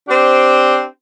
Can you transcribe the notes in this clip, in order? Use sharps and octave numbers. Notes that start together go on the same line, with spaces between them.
C4 D4 G4 C5